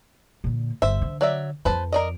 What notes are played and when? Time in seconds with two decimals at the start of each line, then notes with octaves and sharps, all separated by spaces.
0.44 A#2 D3
0.82 G1 C5 E5
1.02 D3
1.21 F#3 D5 E5
1.65 F2 F3 B4 C5 A5
1.92 A#4 D5 D#5